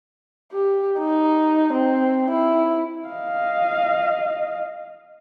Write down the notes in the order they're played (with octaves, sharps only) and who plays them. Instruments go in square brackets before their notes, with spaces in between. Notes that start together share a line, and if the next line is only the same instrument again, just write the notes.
[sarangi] G4
D#4
C4
E4
[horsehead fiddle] D#5 F5